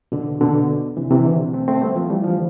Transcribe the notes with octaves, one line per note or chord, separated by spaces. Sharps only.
B2 D3
B2 D3
C3 E3
C3 E3
B2 D3
A3 C4
A3 C4
G3 B3
F3 A3
E3 G3
D3 F3